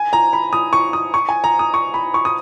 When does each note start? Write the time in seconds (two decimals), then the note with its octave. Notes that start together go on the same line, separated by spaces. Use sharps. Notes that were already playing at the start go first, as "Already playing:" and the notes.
Already playing: G#5
0.13 A#5
0.33 B5
0.53 D#6
0.73 C#6
0.93 D#6
1.14 C#6
1.29 G#5
1.44 A#5
1.59 D#6
1.74 C#6
1.94 B5
2.14 C#6
2.25 D#6